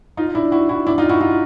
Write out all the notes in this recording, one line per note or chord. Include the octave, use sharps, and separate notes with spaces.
D#4 F4
D4 E4
E4 F#4
E4 F#4
D4 E4
D#4 F4
E4 F#4
D#4 F4